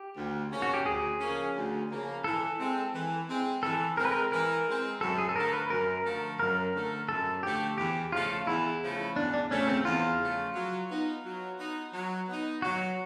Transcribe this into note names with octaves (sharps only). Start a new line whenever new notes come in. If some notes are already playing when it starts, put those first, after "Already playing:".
Already playing: G4
D2
C#3 F3 A#3 C#4
F#4
G4
D2 G#4
C#3 F3 A#3 C#4
D2
C#3 F3 A#3 C#4
E3 A4
G#3 C4
E3
G#3 C4
E3 A4
G#3 C4 A#4
B4
A#4
E3 A#4
G#3 C4
F#2 A4
G#4
A4
D3 F3 A3 A#4
B4
F#2 A#4
D3 F3 A3
F#2 A#4
D3 F3 A3
F#2 A4
D3 F3 A3 G4
E2 G4
C#3 F3 A3 F4
E2 E4
C#3 F3 A3
E2 D4
D4
C#3 F3 A3 C#4
C4
E2 F4
C#3 F3 A3
F#3
B3 D#4
F#3
B3 D#4
F#3
B3
D#4
F#3 F#4